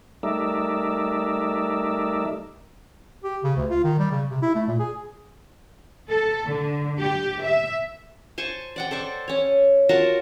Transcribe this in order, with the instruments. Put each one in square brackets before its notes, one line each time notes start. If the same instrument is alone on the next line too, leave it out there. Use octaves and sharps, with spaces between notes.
[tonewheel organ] G3 A3 D#4 A#4 D5 E5
[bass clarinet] G4
C#3
D2
F4
D#3
G3
C#3
C3
E4
A3
A#2
G#4
[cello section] A4
D3
G4
E5
[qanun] C5 G#5 A5 C#6
D5 F#5 G5
A4 C5 D5 C#6
C#4 C#5
F4 F#4 A#4 A5